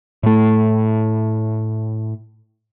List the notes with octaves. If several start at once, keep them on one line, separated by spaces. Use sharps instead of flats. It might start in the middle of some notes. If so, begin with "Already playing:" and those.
A2 A3